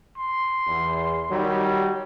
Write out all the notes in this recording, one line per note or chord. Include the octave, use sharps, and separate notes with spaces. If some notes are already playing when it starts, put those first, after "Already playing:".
C6
E2
D#3 F#3 G3